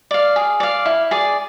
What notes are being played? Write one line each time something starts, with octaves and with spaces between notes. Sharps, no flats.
D5 F5
G#4
D5 F5
E4
G#4 D5